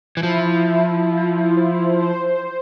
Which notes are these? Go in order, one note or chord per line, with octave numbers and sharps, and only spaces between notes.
E3
F3 E4
E4
F4
C5
C5